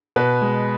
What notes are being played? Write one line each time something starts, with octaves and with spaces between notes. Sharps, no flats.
B2 B4
G#3